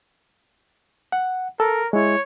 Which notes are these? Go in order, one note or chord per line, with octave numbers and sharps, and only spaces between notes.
F#5
A4 A#4
G#3 E4 C#5